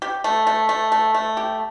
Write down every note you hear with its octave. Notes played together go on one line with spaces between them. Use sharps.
G4
A3
A3
A3
A3
A3
G4